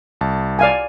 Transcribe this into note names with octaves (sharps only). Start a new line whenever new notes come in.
C2 A5
D5 F5 G#5